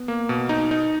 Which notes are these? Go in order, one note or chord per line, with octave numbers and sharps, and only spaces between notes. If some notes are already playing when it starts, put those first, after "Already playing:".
Already playing: B3
A#3
B2
D#4
D#4